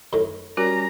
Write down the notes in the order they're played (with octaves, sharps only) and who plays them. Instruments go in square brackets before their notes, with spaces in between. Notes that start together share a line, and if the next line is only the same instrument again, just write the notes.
[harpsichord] F#2 A2 D#3
[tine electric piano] G3 C#4 [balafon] F#4 A#4 [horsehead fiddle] A#5